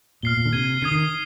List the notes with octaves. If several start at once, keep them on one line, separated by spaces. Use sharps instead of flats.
A#2 F6 C7 G7
A#2
D3
C3 G#6 D#7 G7
D3 D#6 G#6 C7 G7
D#3